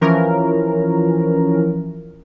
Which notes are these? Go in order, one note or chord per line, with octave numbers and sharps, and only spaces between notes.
E3 F3 C#4 A#4